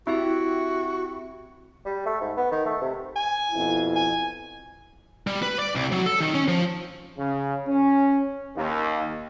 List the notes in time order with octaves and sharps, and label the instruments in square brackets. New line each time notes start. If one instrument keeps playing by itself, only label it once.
[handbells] C4 G4 E5 [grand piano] E4 [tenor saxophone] F#4
[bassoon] G3
A3
G#2
B3
D#3
A3
C3
[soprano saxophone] G#5
[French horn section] F2 B2 E4
[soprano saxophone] G#5
[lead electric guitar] G3
B4
D5
C2
F#3
A4
D#3
C#4
F3
[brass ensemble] C#3
C#4
D#2